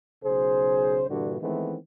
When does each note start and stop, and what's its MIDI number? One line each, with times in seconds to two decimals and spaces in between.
0.24 1.04 35
0.24 1.04 49
0.24 1.04 68
0.24 1.04 72
1.09 1.37 43
1.09 1.37 46
1.09 1.37 50
1.09 1.37 52
1.09 1.37 55
1.09 1.37 66
1.41 1.76 51
1.41 1.76 52
1.41 1.76 56
1.41 1.76 57
1.41 1.76 59
1.41 1.76 60